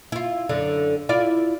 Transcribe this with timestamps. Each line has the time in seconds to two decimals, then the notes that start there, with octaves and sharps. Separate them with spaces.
0.12 E4 F4
0.49 F#2 D3 D5
1.09 E4 F4 D5